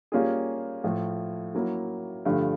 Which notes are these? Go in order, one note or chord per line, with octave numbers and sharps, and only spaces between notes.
G3 A#3 C#4 F4 G#4
A2 F3 A3
F#3 A#3 C#4 E4
G2 D3 F3 A3